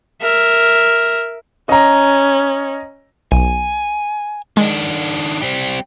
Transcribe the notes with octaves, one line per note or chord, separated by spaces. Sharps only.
A#4 E5
C#4 D#5 A#5
B1 G#5
D#3 G#3 D4
G3 C4